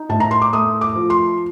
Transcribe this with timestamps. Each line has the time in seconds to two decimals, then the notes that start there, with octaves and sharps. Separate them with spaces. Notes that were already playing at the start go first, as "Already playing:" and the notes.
Already playing: D#4
0.09 A2 A5
0.20 A#5
0.31 C6
0.42 D6
0.53 A3 D#6
0.81 D6
0.96 F3
1.10 C6